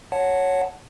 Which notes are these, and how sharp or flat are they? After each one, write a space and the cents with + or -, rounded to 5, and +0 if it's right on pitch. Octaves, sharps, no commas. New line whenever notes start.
C#5 +0 F#5 +0 A5 -5